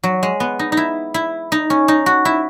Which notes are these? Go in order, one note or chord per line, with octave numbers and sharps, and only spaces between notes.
F#3
G#3
B3
D#4
D#4
E4
E4
D#4
C#4
D#4
F#4
E4